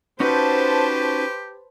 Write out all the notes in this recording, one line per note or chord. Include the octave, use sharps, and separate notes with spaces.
C#4 D#4 F#4 G4 B4 C5 A5